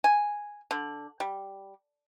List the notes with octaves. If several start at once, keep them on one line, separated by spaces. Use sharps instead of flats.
G#5
D3
G3